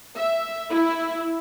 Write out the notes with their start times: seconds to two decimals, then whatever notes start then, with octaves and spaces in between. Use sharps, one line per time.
0.16 E5
0.71 E4